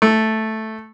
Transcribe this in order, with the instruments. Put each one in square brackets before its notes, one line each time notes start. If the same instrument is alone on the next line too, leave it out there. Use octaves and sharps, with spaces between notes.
[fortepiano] A3